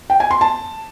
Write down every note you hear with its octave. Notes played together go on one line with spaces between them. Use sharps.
G5
G#5
C6
A5